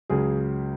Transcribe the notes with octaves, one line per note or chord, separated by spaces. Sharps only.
C#2 C#3 F#3 G#4